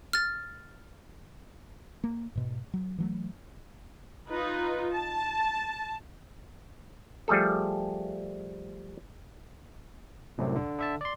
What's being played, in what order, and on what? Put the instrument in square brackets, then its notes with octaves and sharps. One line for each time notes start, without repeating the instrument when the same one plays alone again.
[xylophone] F6 A6
[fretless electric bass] A#3
G#2 B2
F#3
E3 F#3 A3
[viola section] D#4 F4 B4
A5
[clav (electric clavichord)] F3 G3 A3 G#4 A4
[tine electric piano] C2 F#2 A2 C3
D3
D3 E5 A5
D5 C6